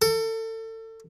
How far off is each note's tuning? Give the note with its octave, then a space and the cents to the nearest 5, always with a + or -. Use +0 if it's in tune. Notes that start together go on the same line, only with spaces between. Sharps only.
A4 +30